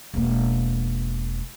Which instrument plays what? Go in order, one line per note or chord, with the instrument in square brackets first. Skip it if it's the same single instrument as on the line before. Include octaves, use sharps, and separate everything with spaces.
[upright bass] E1 A#3